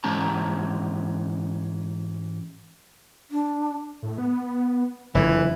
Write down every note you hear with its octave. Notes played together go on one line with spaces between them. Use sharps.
G#2 E3 G#3 C#4 A5 A#5
D4
A2
B3
F#1 F2 D3 E3 F3